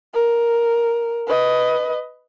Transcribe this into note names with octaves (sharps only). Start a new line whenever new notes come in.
A#4
B4 D#5